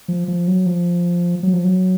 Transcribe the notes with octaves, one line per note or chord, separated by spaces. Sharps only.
F3
F3
F#3
F3
F#3
F3
F#3